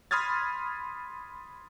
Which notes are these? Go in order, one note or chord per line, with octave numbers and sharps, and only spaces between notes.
B5 C6 D#6 F6 G#6 A6